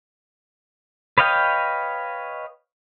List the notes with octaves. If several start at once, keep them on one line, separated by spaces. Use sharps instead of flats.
B4 C#5 D#5 F5 G5